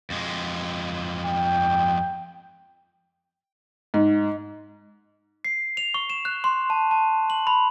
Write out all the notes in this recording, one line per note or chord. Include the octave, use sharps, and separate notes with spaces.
F2 G#3
G5
G#2
C7
F7
C#6
E7
F#6
C6
A5
A5
F#7
B5